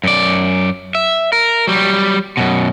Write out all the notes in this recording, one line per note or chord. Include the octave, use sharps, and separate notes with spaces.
F#2 D5
E5
A#4
F#3 G3
F#2 B2